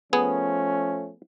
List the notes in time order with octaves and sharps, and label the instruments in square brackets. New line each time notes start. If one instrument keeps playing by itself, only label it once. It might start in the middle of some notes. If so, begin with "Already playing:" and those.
[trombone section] F3 A3 C#4 [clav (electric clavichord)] B3 G#4